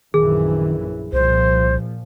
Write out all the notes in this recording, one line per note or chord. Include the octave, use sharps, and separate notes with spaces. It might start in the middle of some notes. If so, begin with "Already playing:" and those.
A#1 F#2 D#3 E3 G#4
C2 A#2 F3 C5